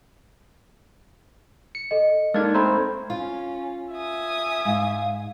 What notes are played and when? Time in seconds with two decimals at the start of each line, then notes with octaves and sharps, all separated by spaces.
1.75 C#7
1.91 A4 D#5
2.34 G#3 A#3 D4 D#4 F6 G#6 A6
2.54 A3 C4 C5 A#5 B5 G#6
3.10 C#4 F4
3.93 E5 G#5 D#6
4.65 G#2 F5